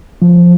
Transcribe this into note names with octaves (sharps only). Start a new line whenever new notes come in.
F3